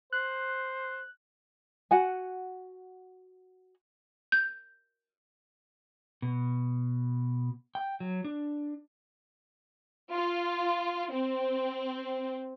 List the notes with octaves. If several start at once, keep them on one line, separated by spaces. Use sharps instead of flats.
C5 F#6
F#4 F#5 G#5
G6
B2
G5
F#3
D4
F4
C4